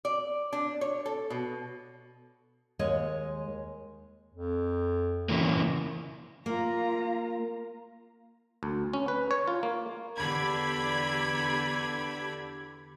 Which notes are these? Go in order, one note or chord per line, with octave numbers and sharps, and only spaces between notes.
D5
D4
C#5
A4
B2
D#2 G#3 C#5 D#5
F2
C#3 E3 A#3
A#3 F4 A#5
D2
C#4
B4
C#5
F4
A#3
E2 D3 G4 D5 B5 G#6